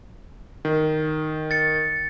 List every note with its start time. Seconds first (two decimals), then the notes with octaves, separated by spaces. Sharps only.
0.65 D#3
1.51 A6 C#7